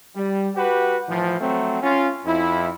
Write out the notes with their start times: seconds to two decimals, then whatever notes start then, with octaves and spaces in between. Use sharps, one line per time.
0.16 G3
0.56 F#4 G4 B4
1.09 A2 E3 F3
1.40 F#3 A3 C4
1.83 C#4 F4
2.25 F2 E4